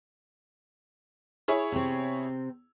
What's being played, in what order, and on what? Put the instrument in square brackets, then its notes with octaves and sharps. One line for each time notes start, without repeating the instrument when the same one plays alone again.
[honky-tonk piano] E4 G#4 C#5
[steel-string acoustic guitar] C3 C4